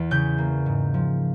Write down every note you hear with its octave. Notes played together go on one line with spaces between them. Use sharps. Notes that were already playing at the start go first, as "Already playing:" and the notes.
Already playing: E2 E3
C#3 G6
A#3
G#2
F3